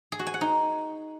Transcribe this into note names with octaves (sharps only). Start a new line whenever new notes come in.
G#4
F#4
G#5
F#5
D#4